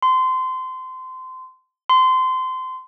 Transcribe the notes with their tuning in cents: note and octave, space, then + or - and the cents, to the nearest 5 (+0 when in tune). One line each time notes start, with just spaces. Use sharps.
C6 -25
C6 -25